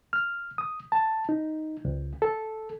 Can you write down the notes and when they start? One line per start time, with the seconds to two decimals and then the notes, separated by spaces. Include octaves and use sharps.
0.13 F6
0.58 D#6
0.92 A5
1.29 D#4
1.85 C#2
2.22 A4